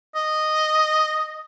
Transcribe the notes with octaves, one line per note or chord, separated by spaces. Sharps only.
D#5